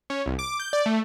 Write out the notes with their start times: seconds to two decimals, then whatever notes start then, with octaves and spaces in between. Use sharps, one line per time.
0.10 C#4
0.26 C2
0.39 D6
0.60 G6
0.73 D5
0.86 A3